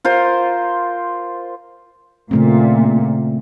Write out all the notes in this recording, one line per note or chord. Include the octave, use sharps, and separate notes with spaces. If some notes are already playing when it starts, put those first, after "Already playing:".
F4 A#4 C5
A#2 C#3 A3 C4